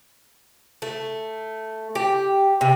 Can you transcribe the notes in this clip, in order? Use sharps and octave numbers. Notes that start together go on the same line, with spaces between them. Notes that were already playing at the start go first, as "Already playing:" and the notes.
A3
G4
C3